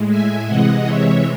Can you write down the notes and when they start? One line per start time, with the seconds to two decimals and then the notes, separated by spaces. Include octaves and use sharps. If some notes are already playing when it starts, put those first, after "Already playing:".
Already playing: A2 G#3
0.10 E5 G#5
0.48 C3 E3 G#3 D#5 F#5
0.85 C#5 E5